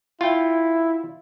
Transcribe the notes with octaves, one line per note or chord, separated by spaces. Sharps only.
E4 F4 G5